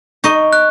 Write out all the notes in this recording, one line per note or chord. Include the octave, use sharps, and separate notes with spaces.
D#4 D#5 C#6
F#6